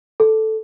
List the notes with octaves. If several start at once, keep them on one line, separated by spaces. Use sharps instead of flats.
A4